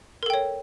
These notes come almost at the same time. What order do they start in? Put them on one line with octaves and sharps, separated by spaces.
A#4 A4 G5 C#5